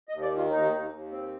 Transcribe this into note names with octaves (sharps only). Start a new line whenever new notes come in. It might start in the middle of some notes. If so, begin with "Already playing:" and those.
D#5
D#2
D5
D#3
F4
D#2 D#4
D#2
D#2
C4